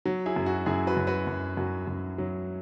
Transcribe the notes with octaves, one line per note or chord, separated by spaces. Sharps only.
F#3
E4 G#4
F#2
F#4
F#2 E4 G#4
F#4 B4
F#2
F#4 B4
F#2
F#2 F#4
F#2
F#3